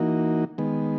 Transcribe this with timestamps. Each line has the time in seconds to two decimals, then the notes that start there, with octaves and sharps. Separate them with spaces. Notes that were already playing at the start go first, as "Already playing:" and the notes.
Already playing: E3 A#3 D#4 F#4
0.58 D#3 G#3 B3